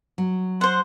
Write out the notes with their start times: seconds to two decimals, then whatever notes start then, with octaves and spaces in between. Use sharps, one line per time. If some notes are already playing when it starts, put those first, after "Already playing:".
0.18 F#3
0.61 C5 F#5 C6